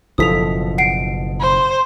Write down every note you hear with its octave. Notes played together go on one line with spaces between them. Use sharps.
F#1 B2 F3 E4 A4 D#6 B6 F7
F#5 C7 D7
C5